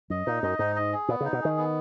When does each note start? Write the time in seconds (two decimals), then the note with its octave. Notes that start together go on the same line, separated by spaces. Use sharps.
0.10 F#2 D#5
0.27 A#2 D#4
0.43 F#2 D#5
0.59 G#2 D#4
0.76 D#5
0.92 G#4
1.09 A#2 B3
1.21 C#3
1.25 D#4
1.33 B2
1.41 D#3 G#4
1.57 B3